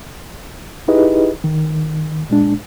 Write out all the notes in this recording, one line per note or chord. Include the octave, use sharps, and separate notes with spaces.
D#4 E4 G4 G#4 B4 D#5
D#3
A#2 G#3 D4